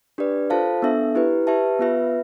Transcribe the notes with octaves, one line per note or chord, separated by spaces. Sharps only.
D4 G4 B4 D5
F4 A4 C5 F5 A5
B3 D4 A4 E5
E4 G4 B4
G4 B4 E5 A5
B3 F4 B4 E5